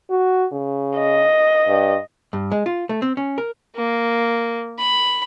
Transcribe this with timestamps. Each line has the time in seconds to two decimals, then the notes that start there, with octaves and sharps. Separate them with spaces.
0.10 F#4
0.52 C#3
0.98 D#5
1.68 G2
2.33 G2
2.52 G#3
2.66 F4
2.89 A3
3.02 C4
3.17 C#4
3.38 A#4
3.76 A#3
4.79 B5